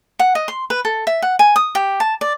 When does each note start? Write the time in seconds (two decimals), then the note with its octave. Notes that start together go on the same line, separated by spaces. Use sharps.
0.19 F#5
0.35 D#5
0.48 C6
0.70 B4
0.85 A4
1.07 E5
1.22 F#5
1.39 G#5
1.56 D#6
1.75 G4
2.00 A5
2.21 D5